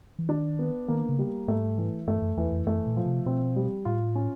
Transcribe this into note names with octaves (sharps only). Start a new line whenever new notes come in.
E3
D#3 D4
B3
D#3 A#3
C#3
G3
G#2 A3
E3
G2 A3
F#2
E2 E3
F2
F#2 A3
A#2
F3
C3
B2 C4
G3
A2 F4
C#4